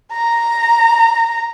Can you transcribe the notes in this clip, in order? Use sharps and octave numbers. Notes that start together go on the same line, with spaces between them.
A#5